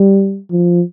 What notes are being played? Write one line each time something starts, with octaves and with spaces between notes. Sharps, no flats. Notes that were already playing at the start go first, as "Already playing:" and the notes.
Already playing: G3
F3